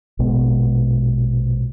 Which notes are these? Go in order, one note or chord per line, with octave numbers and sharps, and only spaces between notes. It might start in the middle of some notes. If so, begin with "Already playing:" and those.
A#1 B2 G#3 B3